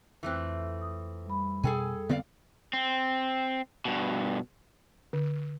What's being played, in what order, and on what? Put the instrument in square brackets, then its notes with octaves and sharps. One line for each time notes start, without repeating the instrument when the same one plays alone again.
[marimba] F2 F#6 [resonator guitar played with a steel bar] E3 A3 C4
[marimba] D#6
G3 B5
[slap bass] B2 [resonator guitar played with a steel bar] G#4 A4 G#5 [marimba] G5
[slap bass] D3 B3 C4 [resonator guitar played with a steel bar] A3 D5 F5
[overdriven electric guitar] C4
G2 B2
[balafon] D3